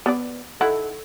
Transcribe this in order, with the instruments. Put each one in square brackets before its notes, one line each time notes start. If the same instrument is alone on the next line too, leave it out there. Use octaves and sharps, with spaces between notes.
[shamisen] B3 D5
[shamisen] D#3 E4 F#5 [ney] A4